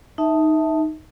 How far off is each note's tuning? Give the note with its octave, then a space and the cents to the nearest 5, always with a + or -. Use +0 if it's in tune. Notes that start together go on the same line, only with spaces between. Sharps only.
D#4 +0 E5 -20 A5 +5